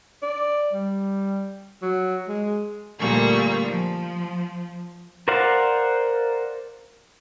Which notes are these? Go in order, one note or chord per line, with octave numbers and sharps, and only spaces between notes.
D5
G3
F#3
G#3
D2 A#2 G3 A#3 C#6
F3
A#4 C5 D5 F5 F#5